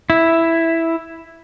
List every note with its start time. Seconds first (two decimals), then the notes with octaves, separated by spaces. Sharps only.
0.10 E4